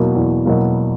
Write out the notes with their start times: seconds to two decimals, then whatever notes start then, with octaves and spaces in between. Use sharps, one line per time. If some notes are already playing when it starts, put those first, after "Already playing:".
Already playing: E2 B2 F#3 A#3
0.16 E2
0.45 B2 F#3 A#3